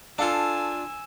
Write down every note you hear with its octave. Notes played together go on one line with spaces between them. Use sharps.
D4 F4 A4 F5 G#5 A5 E6